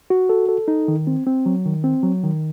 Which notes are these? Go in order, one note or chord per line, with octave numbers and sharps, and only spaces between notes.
F#4
A4
A4
D#4
D#3
C4
C4
F#3
D#3
C4
F#3
D#3